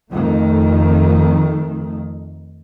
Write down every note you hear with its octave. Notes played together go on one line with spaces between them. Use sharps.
F2 D#3 A3